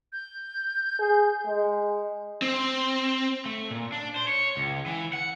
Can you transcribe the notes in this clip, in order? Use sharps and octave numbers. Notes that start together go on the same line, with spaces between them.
G6
G#4
G#3
C4
A3
A#2
D4
C5
C#5
C#2
E3
F#5